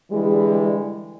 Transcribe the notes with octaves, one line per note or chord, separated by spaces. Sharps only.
D3 E3 G3 G#3